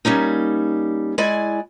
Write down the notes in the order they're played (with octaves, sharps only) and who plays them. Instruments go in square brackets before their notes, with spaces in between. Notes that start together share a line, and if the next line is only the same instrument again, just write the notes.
[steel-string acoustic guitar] G3 A#3 C#4 D#4
G#3 E4 D5 G#5